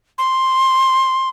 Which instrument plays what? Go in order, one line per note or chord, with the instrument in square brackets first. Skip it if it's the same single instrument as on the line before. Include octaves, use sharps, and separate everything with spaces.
[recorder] C6